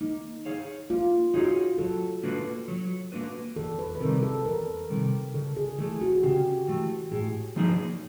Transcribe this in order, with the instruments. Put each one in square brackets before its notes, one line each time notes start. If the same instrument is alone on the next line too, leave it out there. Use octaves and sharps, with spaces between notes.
[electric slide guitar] A#3 [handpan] D#4
[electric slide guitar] D#4 G#4 C#5 F5
[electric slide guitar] A#3 [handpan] F4
[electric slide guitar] D#4 G#4 C#5 F5 [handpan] F#4
[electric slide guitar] F#3 [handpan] A4
[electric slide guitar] A#3 D4 F#4 B4
F#3
A#3 D4 F#4 B4
[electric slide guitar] E2 [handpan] A4
[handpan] B4
B4
[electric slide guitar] C3 D#3 G3 [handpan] A#4
[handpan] A4
B4
[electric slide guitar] E2 [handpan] A#4
[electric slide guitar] C3 D#3 G3
[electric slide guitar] C#3 [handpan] A4
[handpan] G#4
[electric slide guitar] E3 A3 [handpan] G#4
[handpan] F#4
G#4
[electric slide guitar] C#3 [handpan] G4
[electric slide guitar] E3 A3
[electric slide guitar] A2 [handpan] G#4
[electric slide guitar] F3 A#3 D#4 G#4